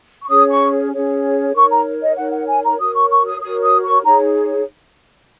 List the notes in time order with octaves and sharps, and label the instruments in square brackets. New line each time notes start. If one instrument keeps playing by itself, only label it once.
[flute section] C#6
C#4 G#4 C#5 D#6
C#6
C#4 G#4 C#5
D#4 A#4 C#5 C#6
A#5
D#5
D#4 A#4 C#5 F#5
F#5
G#5
A#5
F#4 A#4 C#5 D#6
C#6
C#6
D#6
F#4 A#4 C#5 D#6
D#6
C#6
D#4 G#4 C#5 A#5